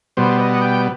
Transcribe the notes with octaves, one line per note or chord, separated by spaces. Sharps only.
B2 G3 B3 C5
D#5
F#5
G5